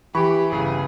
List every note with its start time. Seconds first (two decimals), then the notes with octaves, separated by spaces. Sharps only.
0.15 E3 G4 B5 C#6
0.52 G1 C#3 G#4